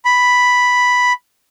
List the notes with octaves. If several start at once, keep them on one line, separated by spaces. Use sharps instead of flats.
B5